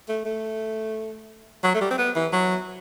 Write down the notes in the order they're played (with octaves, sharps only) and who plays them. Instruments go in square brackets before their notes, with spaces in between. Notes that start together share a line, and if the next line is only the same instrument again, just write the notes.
[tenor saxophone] A3
A3
F#3
A3
G3
C4
B3
E3
F#3